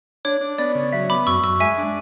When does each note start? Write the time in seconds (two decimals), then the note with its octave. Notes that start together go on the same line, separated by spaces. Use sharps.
0.25 D4 C#5
0.41 D4
0.58 B3 D5
0.75 C#3
0.93 F#3 E5
1.10 B3 B5 D6
1.27 F#2 C#6 E6
1.43 F#2 C#6 E6
1.60 G#3 E5 G#5
1.78 D4